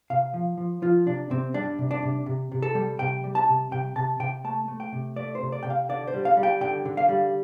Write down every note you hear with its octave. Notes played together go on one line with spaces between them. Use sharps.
C3 F5
F3
F3
F3 F4
C3 D4
C3 C4
G3 D4
C3
D4
C3
C3
C3
A4
G3
C3 G5
G3
A5
C3
C3 G5
C3 A5
C3 G5
A3 A5
A3
G5
C3
A3 D5
C5
C3
D5
C3 G5
F5
D3 D5
C5
G3
F5
G3
G5
D3 G5
D3
F5
G3